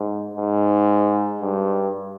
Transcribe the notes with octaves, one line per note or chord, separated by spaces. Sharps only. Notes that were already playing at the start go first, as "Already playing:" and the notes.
Already playing: G#2
G#2
G2